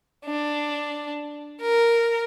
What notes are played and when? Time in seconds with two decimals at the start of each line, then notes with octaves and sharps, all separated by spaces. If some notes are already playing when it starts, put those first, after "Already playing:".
0.25 D4
1.61 A#4